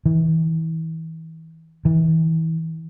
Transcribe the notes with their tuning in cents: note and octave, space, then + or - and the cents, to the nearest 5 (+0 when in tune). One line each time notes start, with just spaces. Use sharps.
E3 -35
E3 -35